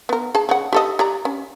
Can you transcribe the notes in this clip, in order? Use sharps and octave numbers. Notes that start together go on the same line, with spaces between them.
B3 A#4
G#4 A5
C#3 F#5
G4 A4 D#5
G4 D5 A#5
C#4